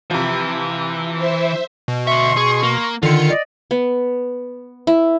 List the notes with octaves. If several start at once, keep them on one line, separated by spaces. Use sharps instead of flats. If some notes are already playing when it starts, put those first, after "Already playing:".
C3 E3 F3
C5 E5
B2
D2 E5 C6 C#6
G#4
A#3
D3 D#3 F4 C#7
D5 D#5
B3
E4